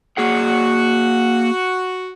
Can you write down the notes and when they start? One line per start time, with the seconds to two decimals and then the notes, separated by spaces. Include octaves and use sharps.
0.17 A#3 F#4 G#4 F#5